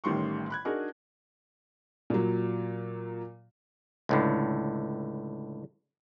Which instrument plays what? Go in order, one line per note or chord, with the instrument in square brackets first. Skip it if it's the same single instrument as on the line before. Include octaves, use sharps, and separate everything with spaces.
[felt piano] A1 A2 D#3 G3 C6 C#6
B5 F#6 G#6
D4 D#4 F#4 G#4 A#4
A#2 F#3
[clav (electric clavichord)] C#2 A2 D3